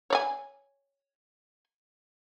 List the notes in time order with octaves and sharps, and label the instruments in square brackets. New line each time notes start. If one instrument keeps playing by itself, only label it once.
[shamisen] C#5 D5 G#5